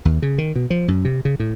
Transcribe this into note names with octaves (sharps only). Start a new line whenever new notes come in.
D#2
C#3
D#3
B2
F3
F#2
C3
C#3
A2